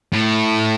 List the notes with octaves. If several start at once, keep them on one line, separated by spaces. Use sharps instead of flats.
A2